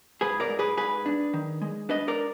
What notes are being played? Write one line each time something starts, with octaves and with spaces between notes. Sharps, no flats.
G#2 G#4 B4
A#4 D5
G#2
G#4 B4
G#2 G#4 B4
D4
D#3
G#3
D4 B4 D#5
A#4 D5